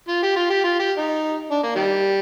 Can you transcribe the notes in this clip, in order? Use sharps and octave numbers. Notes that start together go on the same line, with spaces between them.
F4
G4
F4
G4
F4
G4
D#4
D4
A#3
D#3 G3